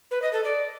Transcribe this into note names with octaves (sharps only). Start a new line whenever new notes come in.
B4
D#5
A4
D5